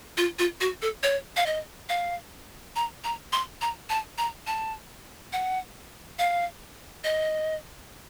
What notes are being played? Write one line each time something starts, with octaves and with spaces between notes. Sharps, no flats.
F4
F4
F#4
A4
C#5
F5
D#5
F5
A#5
A#5
C6
A#5
A5
A#5
A5
F#5
F5
D#5